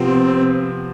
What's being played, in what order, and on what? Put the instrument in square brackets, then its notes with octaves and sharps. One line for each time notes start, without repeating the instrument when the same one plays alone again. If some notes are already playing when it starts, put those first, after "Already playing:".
Already playing: [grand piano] C3 F3 B3 [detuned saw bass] C4